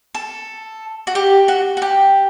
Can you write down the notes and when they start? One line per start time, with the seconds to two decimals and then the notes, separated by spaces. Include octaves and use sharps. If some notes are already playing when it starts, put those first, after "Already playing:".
0.15 A4
1.07 F#4
1.15 G4
1.48 F#4
1.77 F#4
1.82 G4